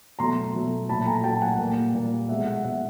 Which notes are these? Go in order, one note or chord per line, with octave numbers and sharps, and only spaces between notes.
B2 F#3 A3 A#5 C6
B2 F#3 A3
A#2 F#3 A3 A5 B5
G#5 A#5
A#2 F#3 A3 G5 A5
F#5 G#5
A#2 G3 A#3
A#2 G3 A#3
B2 G#3 E5 F#5
E5 F#5
B2 G#3 E5 F#5